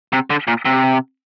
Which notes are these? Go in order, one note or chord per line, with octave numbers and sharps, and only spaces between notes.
C3
D3
A#2
C3